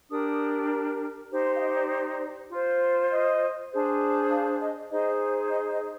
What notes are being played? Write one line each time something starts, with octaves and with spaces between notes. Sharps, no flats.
D4 G4 A#4 D#6
D#4 G4 C5
C6
F5
D#5
D5
F4 C5
D#5
D4 G#4 C5
F5
D#5
D#4 G#4 C5 D#5
D#5
D#5